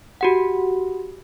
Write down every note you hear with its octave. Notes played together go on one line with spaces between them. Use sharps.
F#4 G4 F#5